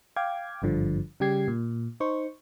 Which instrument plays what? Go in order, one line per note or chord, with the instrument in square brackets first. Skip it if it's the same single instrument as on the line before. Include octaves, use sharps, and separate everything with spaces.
[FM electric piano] F5 G5 D6 G#6
G#1 G2 D3 F3
C#3 G3 G4 G#6 C7
A#2
D#4 C5 C#6